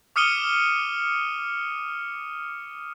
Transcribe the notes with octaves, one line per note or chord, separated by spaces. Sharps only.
D6 D#6 F6 C#7 D#7 G7